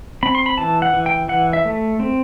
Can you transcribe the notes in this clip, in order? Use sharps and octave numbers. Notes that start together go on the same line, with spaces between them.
C4 B5
C6
B5
E3 A5
F#5
E3
G5
E3 F#5
E5
A3
C4